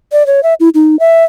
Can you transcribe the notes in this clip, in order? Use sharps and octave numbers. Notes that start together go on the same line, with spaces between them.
D5
C#5
E5
E4
D#4
E5